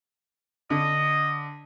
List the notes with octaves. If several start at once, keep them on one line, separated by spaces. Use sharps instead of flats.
D3 D#5